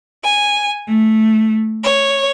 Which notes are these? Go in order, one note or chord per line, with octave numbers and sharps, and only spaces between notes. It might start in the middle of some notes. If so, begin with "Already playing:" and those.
G#5
A3
C#5